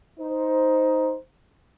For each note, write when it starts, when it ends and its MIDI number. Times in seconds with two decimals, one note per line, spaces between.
0.20 1.16 63
0.20 1.16 72